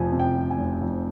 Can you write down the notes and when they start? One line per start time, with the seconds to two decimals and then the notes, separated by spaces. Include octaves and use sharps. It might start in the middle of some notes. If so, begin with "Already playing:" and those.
Already playing: F1 F2 C3 F3 G#5
0.12 C3
0.19 G5
0.36 F3
0.50 G#5
0.58 F1
0.82 F2